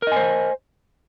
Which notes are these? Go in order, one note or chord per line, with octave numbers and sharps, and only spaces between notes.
A#4 C5 D#5 G#5